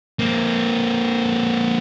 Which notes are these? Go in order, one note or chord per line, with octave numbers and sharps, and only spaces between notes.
A#3 C4